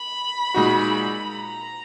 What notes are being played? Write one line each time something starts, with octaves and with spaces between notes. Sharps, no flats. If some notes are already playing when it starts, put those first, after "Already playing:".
Already playing: B5
A#2 G#3 D#4 F#4
A#5